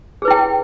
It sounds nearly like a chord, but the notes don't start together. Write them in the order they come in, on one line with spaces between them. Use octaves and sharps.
G#4 B4 E4 G5